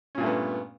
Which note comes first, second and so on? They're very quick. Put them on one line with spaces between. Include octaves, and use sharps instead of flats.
C#4 A#2 G2 A3 B3